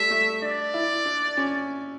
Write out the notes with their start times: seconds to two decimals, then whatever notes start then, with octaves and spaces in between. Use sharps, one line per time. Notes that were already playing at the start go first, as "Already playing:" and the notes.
Already playing: G3 A3 E5
0.11 A3
0.42 D4 D5
0.74 E4
1.05 D4
1.37 C#4